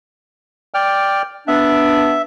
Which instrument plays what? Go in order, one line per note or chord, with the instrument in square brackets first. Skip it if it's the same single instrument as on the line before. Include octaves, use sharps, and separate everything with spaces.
[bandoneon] D5 G5 F6
[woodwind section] B3 D4 [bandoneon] E5